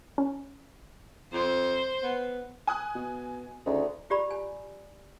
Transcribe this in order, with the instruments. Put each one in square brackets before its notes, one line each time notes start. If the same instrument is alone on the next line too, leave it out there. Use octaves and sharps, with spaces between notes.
[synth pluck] C#4
[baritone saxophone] F2 [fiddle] C5
[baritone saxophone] B3
[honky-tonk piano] G#5 D#6 F#6
[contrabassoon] B2
[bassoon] D2 [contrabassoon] C#3 [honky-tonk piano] D#4
[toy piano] F4 G4 D5 A#5 B5
G#5